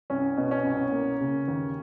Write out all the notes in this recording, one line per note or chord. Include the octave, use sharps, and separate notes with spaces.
C2 C#4
B2
C#4
C2
A#3
C#3
D#2